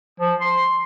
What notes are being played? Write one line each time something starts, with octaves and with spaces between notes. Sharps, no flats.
F3
C6